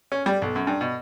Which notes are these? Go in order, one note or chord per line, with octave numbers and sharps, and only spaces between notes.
C#4
G3
B1
F#2
G2
B2